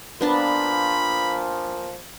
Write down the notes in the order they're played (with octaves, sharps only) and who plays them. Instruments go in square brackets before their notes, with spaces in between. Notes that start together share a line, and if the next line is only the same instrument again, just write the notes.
[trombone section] A#2 F3 [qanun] B3 D4 A5 [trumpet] B5